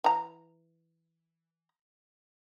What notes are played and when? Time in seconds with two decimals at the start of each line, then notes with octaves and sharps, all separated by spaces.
0.04 E3 A#5